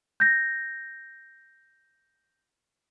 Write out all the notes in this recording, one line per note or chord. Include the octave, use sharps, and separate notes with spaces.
G6 A#6